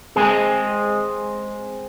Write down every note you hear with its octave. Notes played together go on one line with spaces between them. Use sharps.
G#3 C4 G#4